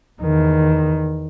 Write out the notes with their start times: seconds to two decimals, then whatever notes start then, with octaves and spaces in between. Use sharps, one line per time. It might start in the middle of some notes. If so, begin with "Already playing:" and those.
0.22 E2 D#3